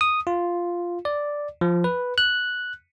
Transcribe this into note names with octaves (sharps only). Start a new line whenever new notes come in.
D#6
F4
D5
F3
B4
F#6